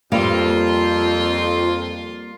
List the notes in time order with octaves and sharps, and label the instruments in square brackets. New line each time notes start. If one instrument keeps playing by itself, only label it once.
[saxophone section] F2 [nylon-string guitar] G3 A#3 F5 [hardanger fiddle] F4 C6